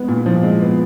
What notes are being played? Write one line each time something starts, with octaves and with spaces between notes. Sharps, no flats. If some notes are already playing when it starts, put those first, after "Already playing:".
Already playing: G#3 B3
A#2
F3
G#3
B3